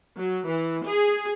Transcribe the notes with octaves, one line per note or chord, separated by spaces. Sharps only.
F#3
E3
G#4